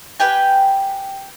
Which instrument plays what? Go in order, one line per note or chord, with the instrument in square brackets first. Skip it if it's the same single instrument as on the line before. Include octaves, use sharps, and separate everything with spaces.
[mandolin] G4 B4 G5 G#5